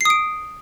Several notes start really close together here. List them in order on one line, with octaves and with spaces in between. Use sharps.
C7 D#6 D7